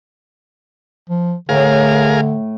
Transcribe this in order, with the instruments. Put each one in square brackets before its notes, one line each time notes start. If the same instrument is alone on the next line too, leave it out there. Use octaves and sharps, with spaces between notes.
[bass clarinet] F3
[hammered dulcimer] A2 [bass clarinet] D3 [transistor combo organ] G#4 A#4 F5